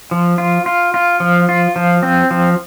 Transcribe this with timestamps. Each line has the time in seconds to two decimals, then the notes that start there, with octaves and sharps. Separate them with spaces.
0.11 F3
0.38 F4
0.66 F4
0.94 F4
1.20 F3
1.49 F4
1.76 F3
2.03 C4
2.31 F3